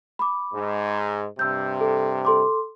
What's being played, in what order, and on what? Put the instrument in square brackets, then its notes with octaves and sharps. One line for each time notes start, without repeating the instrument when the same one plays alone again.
[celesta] B5 D6
[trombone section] G#2
[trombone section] G2 C3 [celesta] E6 G6
[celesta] A4
A4 C6 D6